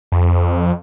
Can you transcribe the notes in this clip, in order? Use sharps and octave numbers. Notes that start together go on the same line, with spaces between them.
F2